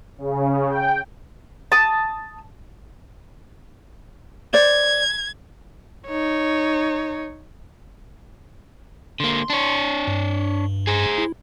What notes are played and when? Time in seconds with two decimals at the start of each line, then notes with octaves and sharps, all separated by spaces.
0.18 C#3
0.69 G5
1.72 A5 D#6
4.53 C5 D5 G#6
6.08 D#4 C#5
9.20 D3 A#3 C6
9.50 D4 C#5
10.08 G2
10.87 G#4 C5
11.18 E4